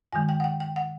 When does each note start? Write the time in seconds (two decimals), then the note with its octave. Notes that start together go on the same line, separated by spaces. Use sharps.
0.12 G2 D#3 G#3 G#5
0.29 G5
0.40 F#5
0.44 G5
0.60 G5
0.76 F#5